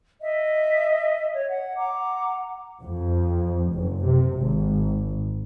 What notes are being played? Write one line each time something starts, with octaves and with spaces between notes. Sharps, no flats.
D#5 E5
C#5
F#5
F#5 A#5 D6
F2
F#1
C3
G#1